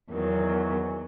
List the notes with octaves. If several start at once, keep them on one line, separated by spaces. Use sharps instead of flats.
E2 D#3 F#3